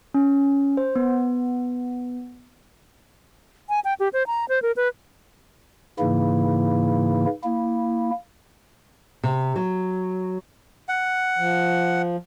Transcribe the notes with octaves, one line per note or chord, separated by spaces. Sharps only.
C#4
C5
B3
G#5
G5
G4
C5
A#5
C5
A#4
B4
G#2 C#3 E3 A#3 E4
A#3 E4
C3
F#3
F#5
F3